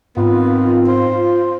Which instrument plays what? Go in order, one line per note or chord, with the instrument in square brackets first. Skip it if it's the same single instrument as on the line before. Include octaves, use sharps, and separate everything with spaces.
[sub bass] G#2 [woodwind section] D#3 C4 [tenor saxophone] B3 [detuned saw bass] F4
[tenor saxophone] C5